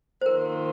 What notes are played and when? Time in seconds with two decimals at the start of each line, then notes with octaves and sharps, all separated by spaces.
0.21 C5
0.26 D#3 A#3 F4 A#4